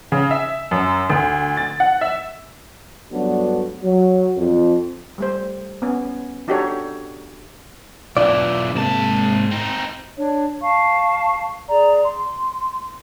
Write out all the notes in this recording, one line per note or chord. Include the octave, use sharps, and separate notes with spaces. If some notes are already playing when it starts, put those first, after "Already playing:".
C#3
E5
F#2
D2
A6
F#5
E5
G2 F#3 A3 B3 D4 F#4
F#3
F2 F3
G3 A3 C5
B3 C#4
D4 D#4 F#4 G4 A4 C#5
B1 E3 D4 F4 D5
G#2 C3 G#3 A#3 A5
C4 D#4
D4 C#5
F5 A5 C#6
G#4 D5 A#5
C6